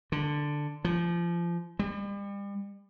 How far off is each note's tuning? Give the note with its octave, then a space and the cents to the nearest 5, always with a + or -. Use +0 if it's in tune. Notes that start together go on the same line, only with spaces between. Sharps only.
D3 +5
F3 -25
G3 +40